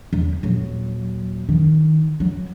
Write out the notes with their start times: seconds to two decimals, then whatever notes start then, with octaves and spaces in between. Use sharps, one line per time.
0.13 E2
0.43 D#1 F#3
1.49 D#3
2.20 F#3